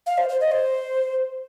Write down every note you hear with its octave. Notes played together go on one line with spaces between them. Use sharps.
F5
C5
C5
D#5
C5